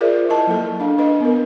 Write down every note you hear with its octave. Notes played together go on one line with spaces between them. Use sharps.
F4 G#4 A#4 C5 D5 E5
E4 A#4 D#5 A5
F#3 A#3 A4
D4 F5
D4 B4 D#5
B3 A#4